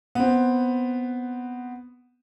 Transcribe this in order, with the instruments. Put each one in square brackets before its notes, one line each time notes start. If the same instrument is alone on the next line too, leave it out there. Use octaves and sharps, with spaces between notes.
[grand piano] B3 C4